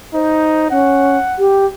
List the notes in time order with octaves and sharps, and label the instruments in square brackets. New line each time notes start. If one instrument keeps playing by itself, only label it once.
[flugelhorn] D#4 [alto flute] C5
[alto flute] C#4 [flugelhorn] F#5
[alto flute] G4